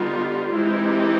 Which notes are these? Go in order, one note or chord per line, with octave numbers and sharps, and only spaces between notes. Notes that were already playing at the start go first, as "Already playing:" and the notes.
Already playing: D3 G3 B3 D#4 F4
E3 G#3 C4 D#4 E4 G4